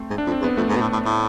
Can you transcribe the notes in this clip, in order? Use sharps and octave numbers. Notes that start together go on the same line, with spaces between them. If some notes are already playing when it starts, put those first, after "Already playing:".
Already playing: A3 C4
G#2
D4
F2
C4
E2
B3
F2 A3
G#2
B2
A2
A2
A2